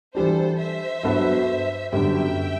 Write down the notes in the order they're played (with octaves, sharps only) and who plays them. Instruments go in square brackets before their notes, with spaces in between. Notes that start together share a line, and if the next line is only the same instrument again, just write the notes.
[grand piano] E3 G3 D4 [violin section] A4 C5
[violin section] C5 E5
[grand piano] G2 F#3 B3 F#4 A4
[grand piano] F#2 D3 G3 B3 [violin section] E5 G5